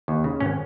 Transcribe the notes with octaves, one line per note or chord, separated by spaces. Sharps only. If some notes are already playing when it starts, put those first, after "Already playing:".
D#2
C#3
G#1 C#4